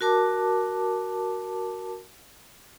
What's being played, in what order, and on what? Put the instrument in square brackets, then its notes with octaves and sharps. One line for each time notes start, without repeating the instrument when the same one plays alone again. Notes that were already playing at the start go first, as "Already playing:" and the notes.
[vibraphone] F#4 A#4 A5 D6